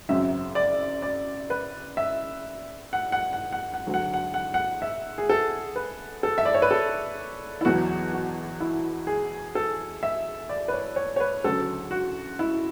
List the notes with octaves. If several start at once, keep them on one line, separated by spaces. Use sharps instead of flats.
G#1 F#2 C#3 F#3 E5
D5
D5
B4
E5
F#5
F#5
F#5
F#5
F#5
D2 D3 F#3
F#5
F#5
F#5
F#5
E5
G#4
A4
B4
A4
E5
D5
C#5
B4
A4
E4
E2 B2 F#3 F#4
F#4
E4
G#4
A4
E5
D5
B4
C#5
C#5
C#5
B4
D2 C#3 F#3 A4
F#4
E4